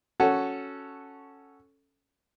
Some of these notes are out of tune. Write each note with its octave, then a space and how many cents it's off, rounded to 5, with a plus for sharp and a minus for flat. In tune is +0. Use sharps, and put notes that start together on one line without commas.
C#4 +0 F#4 +0 A4 +0